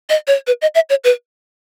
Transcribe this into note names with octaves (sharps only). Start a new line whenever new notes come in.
D#5
C#5
B4
D#5
E5
C#5
B4